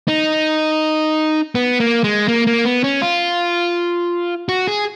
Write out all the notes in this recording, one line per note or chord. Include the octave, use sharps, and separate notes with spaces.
D#4
B3
A#3
G#3
A#3
A#3
B3
C#4
F4
F#4
G#4